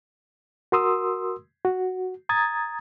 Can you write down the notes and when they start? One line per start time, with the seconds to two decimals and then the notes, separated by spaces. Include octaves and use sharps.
0.72 F#4 A#4 C6 D#6 E6
1.65 F#4
2.29 A#5 D#6 G#6 A6